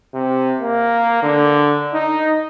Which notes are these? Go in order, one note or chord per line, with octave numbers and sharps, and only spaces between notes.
C3
A#3
D3
D#4